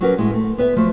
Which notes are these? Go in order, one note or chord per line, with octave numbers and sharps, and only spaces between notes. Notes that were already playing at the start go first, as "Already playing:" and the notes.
F#3 G3 C#4 F#4 A#4 B4
A2 G#3 E4
A3
B3 B4 E5
F3 F#3 A3